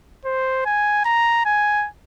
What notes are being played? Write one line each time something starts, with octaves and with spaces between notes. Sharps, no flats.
C5
G#5
A#5
G#5